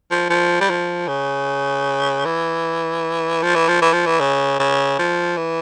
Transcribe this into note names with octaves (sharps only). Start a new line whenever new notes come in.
F3
F3
G3
F3
C#3
E3
F3
E3
F3
E3
F3
E3
C#3
C#3
F3
E3